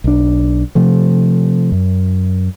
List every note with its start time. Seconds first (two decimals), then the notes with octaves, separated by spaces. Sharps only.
0.04 B1 D4
0.75 C3 F3 A3
1.72 F#2